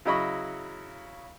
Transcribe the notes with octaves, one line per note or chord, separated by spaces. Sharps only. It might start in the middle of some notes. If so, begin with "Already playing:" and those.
C#3 F#3 E4 D#5 B5 C#6